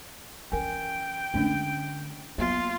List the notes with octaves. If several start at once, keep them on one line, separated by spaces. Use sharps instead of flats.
E3 C#4 A#4 G5 G#5
D3 G#3 A3 C#4 D4
F#3 A#3 B3 F4